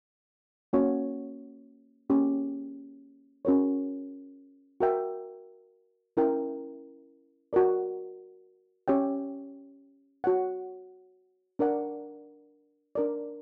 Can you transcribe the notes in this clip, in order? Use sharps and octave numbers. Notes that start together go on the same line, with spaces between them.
A#3 C#4 F#4 C#5 F#5
A#3 C#4 G4
C#4 F#4 A#4 C#5
F#4 A#4 E5 G5
C#4 E4 A#4 E5 G5
F#4 A#4 D5
C#4 G4 C#5 E5 G5
F#4 C#5 F#5
D4 A#4 D5 F#5
D4 A#4 D5